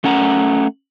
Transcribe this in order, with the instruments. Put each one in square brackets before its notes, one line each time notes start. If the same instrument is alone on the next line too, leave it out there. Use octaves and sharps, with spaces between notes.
[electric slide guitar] A3 C#4 F#5 A#5